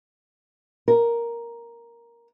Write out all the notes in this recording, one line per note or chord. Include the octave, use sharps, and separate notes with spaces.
A#4